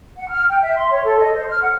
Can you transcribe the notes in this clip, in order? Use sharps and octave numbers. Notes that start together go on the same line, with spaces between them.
F#5
F6
G5
E5
C6
C#5
A4
D#5
C5
F6
F#5